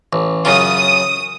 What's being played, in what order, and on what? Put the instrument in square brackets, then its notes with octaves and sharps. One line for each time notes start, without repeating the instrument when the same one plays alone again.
[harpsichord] A1
[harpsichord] F#2 C#3 F4 [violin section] D#6